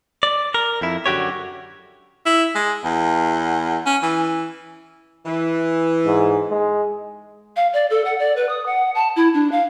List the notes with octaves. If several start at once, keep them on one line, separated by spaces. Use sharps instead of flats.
D5
A#4
F2 E4
F#2 D3 F#4 G4 C#5
E4
G#3
E2
C#4
E3
E3
G#2
G#3
F5
D5
A4
F#5
D5
B4
D#6
F#5
A5
E4
D4
F5